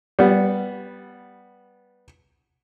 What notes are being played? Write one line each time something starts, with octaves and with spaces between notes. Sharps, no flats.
G3 B3